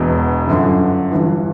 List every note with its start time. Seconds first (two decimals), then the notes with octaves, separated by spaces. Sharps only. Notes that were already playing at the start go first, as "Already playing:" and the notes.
Already playing: E1 E2 B2
0.48 G1 F#2 D3
1.12 G1 G2 E3